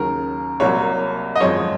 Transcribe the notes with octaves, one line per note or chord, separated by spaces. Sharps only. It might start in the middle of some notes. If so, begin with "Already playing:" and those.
Already playing: D#2 C#3 F#3 A#4
C2 C3 F#3 A#3 C#5
D#5
G#1 F#2 F3 G#3 C4 C#5